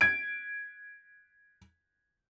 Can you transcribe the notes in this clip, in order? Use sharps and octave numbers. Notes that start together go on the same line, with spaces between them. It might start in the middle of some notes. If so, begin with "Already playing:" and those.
G#6 D7